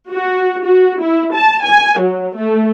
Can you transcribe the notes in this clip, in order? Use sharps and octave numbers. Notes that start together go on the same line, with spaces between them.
F#4
F#4
E4
A5
G#5
F#3
A3